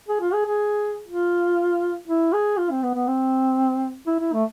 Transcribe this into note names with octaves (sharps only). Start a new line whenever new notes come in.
G#4
F4
G#4
G#4
F4
E4
G#4
F4
C4
B3
B3
C4
E4
E4
A3